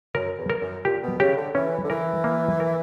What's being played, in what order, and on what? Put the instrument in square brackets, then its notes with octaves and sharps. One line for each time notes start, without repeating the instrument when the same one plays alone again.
[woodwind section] F#2 [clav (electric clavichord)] A#4
[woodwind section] E2
[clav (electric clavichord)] A#4
[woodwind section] F#2
[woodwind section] A#2 [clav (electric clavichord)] G4
[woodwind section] B2
[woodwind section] C#3 [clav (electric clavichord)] G4
[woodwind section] D3
[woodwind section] E3 [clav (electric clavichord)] C#4
[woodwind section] D3
[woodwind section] E3 [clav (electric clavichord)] A#4
[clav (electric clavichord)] A#3
A#4